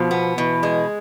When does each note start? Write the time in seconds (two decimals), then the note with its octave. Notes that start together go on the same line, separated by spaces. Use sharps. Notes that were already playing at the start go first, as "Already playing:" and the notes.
Already playing: B2 F3
0.11 B3
0.37 B2 E3
0.63 G#3